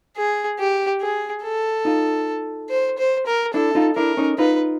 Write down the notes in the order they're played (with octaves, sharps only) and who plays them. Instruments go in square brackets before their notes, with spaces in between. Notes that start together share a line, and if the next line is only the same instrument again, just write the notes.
[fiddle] G#4
G4
G#4
A4
[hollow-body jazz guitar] D#4 F4
[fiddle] C5
C5
A#4
[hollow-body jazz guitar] D4 E4 [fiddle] A4
[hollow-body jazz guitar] D#4 F4
[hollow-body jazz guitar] D4 E4 [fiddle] A#4
[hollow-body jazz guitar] C#4 D#4
[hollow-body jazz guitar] D#4 F4 [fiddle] B4